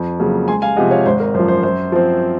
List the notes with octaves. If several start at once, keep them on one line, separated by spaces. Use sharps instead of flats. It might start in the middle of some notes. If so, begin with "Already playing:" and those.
Already playing: F2
C#3 F#3 A#3
C#2 G#5 C6
F5 G#5
C3 F3 G#3 D#5 F#5
C#5 F5
G#1 C5
A#4
F#2 F3 C5
C5
F#2 C5
F3 C4